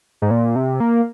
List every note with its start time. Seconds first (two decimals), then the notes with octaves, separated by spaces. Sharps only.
0.22 G#2
0.31 A#2
0.56 C3
0.80 A#3